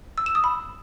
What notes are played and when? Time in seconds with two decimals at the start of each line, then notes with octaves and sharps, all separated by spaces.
0.18 E6
0.26 E7
0.35 D#6
0.44 B5